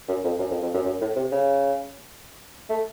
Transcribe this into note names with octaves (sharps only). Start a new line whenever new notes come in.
F#2
F2
F#2
F2
F2
F#2
F#2
A2
C3
C#3
A3